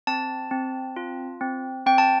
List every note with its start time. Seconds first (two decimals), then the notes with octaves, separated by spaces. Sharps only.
0.07 C4 A5
0.51 C4
0.96 F4
1.41 C4
1.86 C4 G5
1.98 A5